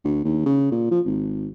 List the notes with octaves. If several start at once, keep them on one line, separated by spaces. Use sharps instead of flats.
D2
D#2
C#3
A#2
F3
G#1